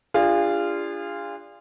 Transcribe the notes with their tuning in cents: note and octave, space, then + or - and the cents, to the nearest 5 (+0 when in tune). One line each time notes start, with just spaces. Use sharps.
D4 +0 F4 -15 G#4 -35